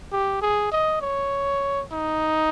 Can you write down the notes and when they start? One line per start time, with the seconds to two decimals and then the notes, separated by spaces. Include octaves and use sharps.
0.12 G4
0.42 G#4
0.72 D#5
1.01 C#5
1.92 D#4